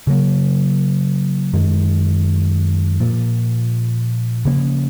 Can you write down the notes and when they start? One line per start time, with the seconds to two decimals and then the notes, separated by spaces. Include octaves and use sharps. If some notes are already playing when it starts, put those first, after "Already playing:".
0.07 C#3 F#3 A#3
1.53 F#2 D#3 G#3
3.00 A#2 F3 A#3
4.45 C#3 F3 A#3 C#4